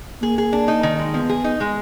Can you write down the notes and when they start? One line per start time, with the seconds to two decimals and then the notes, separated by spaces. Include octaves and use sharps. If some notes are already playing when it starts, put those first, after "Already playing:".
0.22 A#3 G#4
0.38 G#4
0.53 D4
0.68 D#4
0.83 D#3
0.99 G#3
1.14 F3 B3
1.29 G#4
1.44 D#4
1.60 G#3